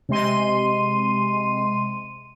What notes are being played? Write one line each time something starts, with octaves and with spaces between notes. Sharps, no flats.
C3 G#3 C6 D#7